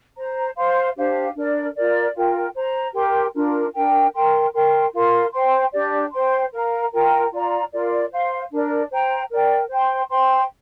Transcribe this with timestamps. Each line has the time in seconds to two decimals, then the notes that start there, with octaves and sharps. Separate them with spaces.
0.16 C5 A#5
0.56 C5 F5 C6
0.96 D4 G4 C5 F5
1.35 D4 A#4 D5
1.75 F4 A#4 D5
2.15 F4 A#4 G5
2.55 C5 A#5
2.94 G4 A#4 G5 C6
3.34 D4 F4 A#4
3.74 D4 A#4 G5
4.14 A#4 G5 C6
4.53 A#4 G5 C6
4.93 F4 A#4 F5 C6
5.33 C5 G5 C6
5.72 D4 G4 D5
6.12 C5 G5 C6
6.52 A#4 F5 A#5
6.92 F4 A#4 G5 A#5
7.31 F4 D5 A#5
7.72 F4 A#4 D5
8.10 C5 F5 C6
8.51 D4 A#4 D5
8.90 C5 G5 A#5
9.30 A#4 D5 G5
9.69 C5 G5 C6
10.09 C5 G5 C6